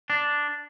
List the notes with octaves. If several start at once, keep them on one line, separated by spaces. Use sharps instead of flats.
D4